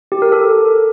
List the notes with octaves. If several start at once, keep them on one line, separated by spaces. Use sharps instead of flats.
G4
A#4
A4